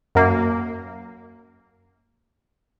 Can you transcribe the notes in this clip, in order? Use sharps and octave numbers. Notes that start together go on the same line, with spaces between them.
F#2 A#3